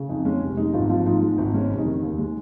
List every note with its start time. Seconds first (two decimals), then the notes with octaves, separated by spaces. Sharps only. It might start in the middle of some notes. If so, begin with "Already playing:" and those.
Already playing: C#3
0.09 F2 D#4
0.25 G#3 C#4
0.42 F1
0.57 G#3 D#4
0.73 G#1 F4
0.89 F3 F4
1.06 G#2 F4
1.22 G#3
1.38 G#1
1.54 G#3 C#4
1.71 F1
1.78 D#4
1.86 D#3
2.02 D#2
2.18 G#3